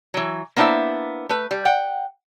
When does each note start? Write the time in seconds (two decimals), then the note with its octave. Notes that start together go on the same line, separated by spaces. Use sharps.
0.14 E3 F#3
0.56 A#3 B3 D4 E4 C5 E5
1.29 A3 B4
1.51 G3
1.65 F#5 G5